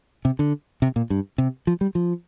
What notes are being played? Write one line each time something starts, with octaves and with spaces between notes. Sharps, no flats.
C3
D3
C3
A#2
G2
C3
F3
G3
F3